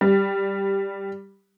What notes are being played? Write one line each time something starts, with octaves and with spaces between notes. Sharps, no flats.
G3